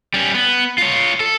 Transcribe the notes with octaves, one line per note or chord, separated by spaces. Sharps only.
G3 C#4
B3
F4 C#5
A4